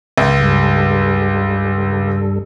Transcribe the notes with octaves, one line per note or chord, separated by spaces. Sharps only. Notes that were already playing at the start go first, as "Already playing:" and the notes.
C#2
G2 G3 A4